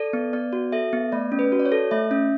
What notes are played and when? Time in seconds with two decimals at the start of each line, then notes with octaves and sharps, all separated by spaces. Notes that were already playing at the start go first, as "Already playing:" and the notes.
Already playing: A4 D5
0.13 B3
0.33 B3 D5
0.53 F#4
0.72 A4 E5
0.93 B3
1.12 A3 D5
1.32 C#4
1.39 B4
1.52 F#4
1.60 D5
1.65 C#5
1.72 A4
1.91 A3 E5
2.11 C#4